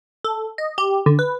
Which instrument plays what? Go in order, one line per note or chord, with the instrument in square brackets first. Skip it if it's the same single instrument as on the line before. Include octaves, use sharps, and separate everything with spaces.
[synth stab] A4
D#5
G4
D3
B4